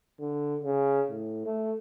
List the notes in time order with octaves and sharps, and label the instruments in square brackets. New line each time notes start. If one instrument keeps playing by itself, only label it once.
[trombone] D3
C#3
A2
A3